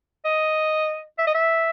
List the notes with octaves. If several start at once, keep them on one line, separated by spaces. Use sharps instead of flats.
D#5
E5
D#5
E5